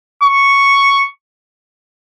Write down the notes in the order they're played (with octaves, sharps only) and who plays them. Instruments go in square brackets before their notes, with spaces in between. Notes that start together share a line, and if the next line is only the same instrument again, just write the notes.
[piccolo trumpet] C#6